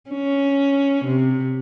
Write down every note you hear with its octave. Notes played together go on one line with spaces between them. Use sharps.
C#4
C3